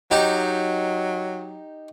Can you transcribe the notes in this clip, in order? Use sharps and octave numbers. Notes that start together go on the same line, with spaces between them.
F#3 D#4 G4